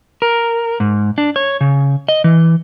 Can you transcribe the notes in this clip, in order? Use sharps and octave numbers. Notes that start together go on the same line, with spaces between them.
A#4
G#2
D4
C#5
C#3
D#5
E3